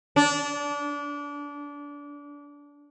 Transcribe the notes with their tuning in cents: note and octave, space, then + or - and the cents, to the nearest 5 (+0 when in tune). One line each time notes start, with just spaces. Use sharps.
D4 -25